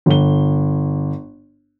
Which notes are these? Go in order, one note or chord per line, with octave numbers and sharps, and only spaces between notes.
G1 G7